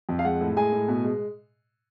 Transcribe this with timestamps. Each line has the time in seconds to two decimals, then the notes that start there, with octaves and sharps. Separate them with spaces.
0.09 F2
0.19 F5
0.24 G#3 F#5
0.41 A2
0.56 G#3 G#5
0.72 A2
0.88 B2
1.04 G#3